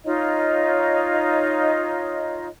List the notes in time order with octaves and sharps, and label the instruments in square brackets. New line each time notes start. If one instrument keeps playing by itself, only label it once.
[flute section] D#4 F4 C#5 D#5